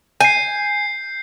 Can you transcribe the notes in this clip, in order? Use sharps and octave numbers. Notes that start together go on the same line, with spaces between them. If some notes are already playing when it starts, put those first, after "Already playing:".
G#5 G6 C7